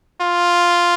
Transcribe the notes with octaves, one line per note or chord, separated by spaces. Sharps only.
F4